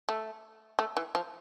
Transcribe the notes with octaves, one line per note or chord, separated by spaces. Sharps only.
A3
A3
E3
F3